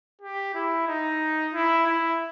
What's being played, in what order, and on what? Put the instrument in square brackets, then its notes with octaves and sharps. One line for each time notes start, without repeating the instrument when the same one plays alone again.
[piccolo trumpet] G4
E4
D#4
E4
E4